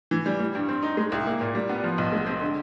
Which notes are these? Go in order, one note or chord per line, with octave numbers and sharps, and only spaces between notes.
E3
G3
G3
G2
C4
D#4
G#3
C2
A#3
A#2
G3
B3
F3
B1
G#3
C4
D3